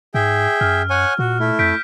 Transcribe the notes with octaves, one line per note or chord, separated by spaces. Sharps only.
G#2 G#4 E5 G5
F#2 F6
C#5 F#5 G#5
A#2 F#4
A3 E4
F2 G6 B6 D7